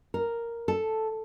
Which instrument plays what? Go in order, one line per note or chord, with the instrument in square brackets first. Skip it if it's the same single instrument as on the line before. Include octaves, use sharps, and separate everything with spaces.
[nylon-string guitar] A#4
A4